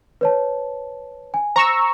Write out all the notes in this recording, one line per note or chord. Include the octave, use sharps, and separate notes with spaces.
B4 C#5 A5
G#5
C5 A#5 C#6 E6